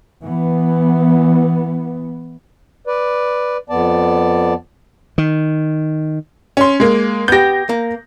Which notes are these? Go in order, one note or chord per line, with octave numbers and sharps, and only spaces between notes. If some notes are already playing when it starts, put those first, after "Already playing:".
E3 B3
B4 D5
F2 B3 D5 A5
D#3
C#4 C6
G#3 A#3
B3 G4 G6 A#6
A#3